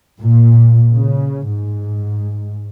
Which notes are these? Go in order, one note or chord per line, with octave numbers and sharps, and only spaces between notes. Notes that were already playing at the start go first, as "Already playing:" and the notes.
A#2
C#3
G#2